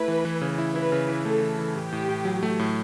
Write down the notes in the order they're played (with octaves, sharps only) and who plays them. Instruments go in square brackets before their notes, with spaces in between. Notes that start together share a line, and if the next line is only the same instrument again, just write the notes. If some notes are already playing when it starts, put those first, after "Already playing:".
Already playing: [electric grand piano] A3 E4 [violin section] B4
[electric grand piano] E3
E3
C#3
E4
[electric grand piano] E4 [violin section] B4
[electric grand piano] C#3
E3
[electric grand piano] A3 [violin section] A4
[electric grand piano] E3
E3
[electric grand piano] A2 [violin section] G4
[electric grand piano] A2
A2
F#3
A3
A2